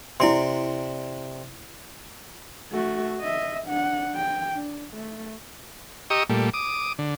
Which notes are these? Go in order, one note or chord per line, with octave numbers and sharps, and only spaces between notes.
C3 E4 D5 C6
A3 F#4
D#5 E5
D4 F#5
G5
D4
A3
G4 D#5 A#5 C#6 D#6 E6
A#2 G3 A3
D6 D#6
D3